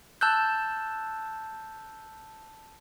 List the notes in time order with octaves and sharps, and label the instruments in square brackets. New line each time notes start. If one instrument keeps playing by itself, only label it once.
[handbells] A5 E6 F#6 G6